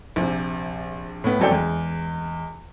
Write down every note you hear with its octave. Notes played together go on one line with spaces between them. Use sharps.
A#1 C3
A2 B3
F#1 F2 F#3 A4 D5 G5
E2 G#3